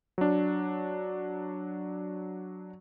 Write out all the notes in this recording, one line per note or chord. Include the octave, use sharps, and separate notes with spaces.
F#3 D4